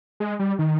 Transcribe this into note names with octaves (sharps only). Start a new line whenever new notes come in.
G#3
G3
D#3